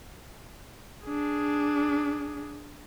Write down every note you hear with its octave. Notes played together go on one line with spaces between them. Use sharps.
D4 G#4